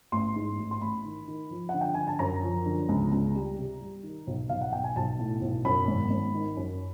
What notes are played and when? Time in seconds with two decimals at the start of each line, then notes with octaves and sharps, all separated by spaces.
0.12 A1 C6
0.36 G#2
0.59 A1
0.71 C6
0.81 A1 B5
1.05 D#3
1.28 D#3
1.51 F3
1.69 D3 F#5
1.81 G5
1.94 D3 G#5
2.07 A5
2.19 F#2 A#5
2.43 F3
2.66 D3
2.89 C#2
3.12 C#2
3.35 G3
3.58 C3
3.81 G3
4.03 D#3
4.27 B1
4.49 B1 F5
4.61 F#5
4.73 B1 G5
4.84 G#5
4.96 B1 A5
5.19 A2
5.41 B1
5.65 F#2 B5
5.88 G#1
6.11 G#1
6.34 D#3
6.57 F#2